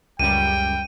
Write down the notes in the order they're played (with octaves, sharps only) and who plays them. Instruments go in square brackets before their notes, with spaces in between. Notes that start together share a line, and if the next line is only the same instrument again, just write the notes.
[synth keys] C#2 F#2 G3 [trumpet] G5 [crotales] D#7